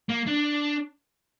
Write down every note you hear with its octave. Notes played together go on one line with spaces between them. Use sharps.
A#3
D4